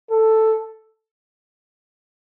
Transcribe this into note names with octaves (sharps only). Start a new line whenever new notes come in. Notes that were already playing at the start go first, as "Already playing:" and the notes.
A4